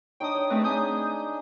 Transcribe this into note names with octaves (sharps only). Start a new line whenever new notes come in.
D4 D#4 C#5 G5 D#6
C#5
G#3 A3 C4 B4
D4 D#4 G#5 D#6 G6